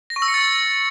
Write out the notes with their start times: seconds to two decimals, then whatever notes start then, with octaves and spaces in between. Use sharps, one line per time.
0.10 A#6
0.16 C#6
0.22 E6
0.28 C#7
0.34 A6